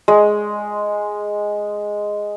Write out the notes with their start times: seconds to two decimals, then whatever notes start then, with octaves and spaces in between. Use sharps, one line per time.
0.08 G#3